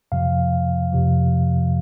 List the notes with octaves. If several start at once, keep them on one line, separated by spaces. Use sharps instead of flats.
F2 C3 F3 F5
F2 C3 F3